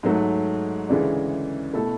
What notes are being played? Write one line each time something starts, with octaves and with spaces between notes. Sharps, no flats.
G#2 F#3 A3
D2 C#3 E3 G#3 D4
B2 A3 E4 A4